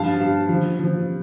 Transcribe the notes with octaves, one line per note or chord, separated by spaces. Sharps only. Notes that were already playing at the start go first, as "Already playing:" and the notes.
Already playing: G2 F3 F5 A5
G2
F3
F3